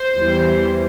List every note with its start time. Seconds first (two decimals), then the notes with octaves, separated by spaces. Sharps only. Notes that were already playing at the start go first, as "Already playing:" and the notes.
Already playing: C5
0.15 E2 E3 G3